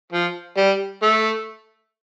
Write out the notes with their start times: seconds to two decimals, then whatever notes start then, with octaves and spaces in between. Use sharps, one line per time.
0.12 F3
0.57 G3
1.03 A3